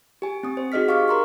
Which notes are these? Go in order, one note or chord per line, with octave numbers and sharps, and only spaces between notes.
G4 G#5
C4 D#6
C5
D#4 F#4 G#4 D#5 F6 B6
G4 F5 C#6 D6 F6
A#4 A#5 C6 C#6